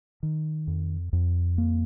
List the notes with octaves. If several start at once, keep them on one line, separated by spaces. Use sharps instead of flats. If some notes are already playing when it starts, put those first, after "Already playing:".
D#3
F2
F2
A#3